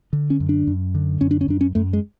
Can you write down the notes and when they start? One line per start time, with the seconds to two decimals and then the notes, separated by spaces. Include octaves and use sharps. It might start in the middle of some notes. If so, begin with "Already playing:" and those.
0.13 D3
0.30 C#4
0.40 F#2
0.49 D4
0.67 F#2
0.95 D3
1.21 F#2 C#4
1.31 D4
1.41 C#4
1.48 F#2 D4
1.61 C#4
1.75 F#2 A3
1.93 G#3